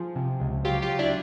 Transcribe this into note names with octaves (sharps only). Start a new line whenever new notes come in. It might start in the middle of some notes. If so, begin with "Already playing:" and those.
Already playing: F3 G#4
C3
C#2
F#3 F4 G4
F4 G4
F#3
D4 E4